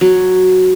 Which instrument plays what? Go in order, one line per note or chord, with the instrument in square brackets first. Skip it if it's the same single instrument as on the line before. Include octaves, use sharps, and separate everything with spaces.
[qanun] F#3